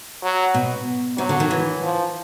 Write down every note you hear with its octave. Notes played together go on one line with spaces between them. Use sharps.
F#3
B2
C3 F#3
D3
D#3
E3
F3